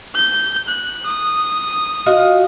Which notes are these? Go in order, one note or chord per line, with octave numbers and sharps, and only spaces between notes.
G6
F#6
D#6
F4 F#4 D#5